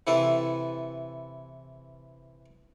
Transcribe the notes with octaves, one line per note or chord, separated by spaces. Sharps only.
C3 E3 E4 A4 B4